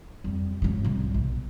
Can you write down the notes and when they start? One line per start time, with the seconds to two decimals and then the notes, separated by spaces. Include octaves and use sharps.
0.24 F2 G3
0.62 G#2 C#3
0.85 C2 G3
1.14 B1